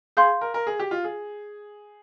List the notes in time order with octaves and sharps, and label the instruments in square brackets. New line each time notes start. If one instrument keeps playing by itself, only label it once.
[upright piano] G#4 [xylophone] F5 C6 G6
[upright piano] A#4
A#4
G#4
G4
F4
G#4